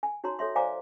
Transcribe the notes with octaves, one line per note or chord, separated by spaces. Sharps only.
G#5
D#4 F#4 C#5 A#5 C6
A4 C#5 E5 C6
C5 D5 F5 G#5 A#5 D6